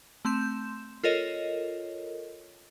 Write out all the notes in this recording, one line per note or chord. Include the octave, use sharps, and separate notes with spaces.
A3 C4 C6 G6 E7
F4 A4 A#4 C#5 D#5